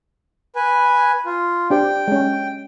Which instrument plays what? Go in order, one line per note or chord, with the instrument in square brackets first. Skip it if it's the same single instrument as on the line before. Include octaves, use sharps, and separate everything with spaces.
[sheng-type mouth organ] B4 G#5
F4
[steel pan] D4 G4 C5 [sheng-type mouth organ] G5
[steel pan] G#3 C#4